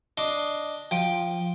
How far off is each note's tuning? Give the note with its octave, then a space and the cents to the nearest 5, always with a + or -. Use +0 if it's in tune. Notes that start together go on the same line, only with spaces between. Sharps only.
D4 +0 D#5 +0 C6 +0
F3 +0 G5 +0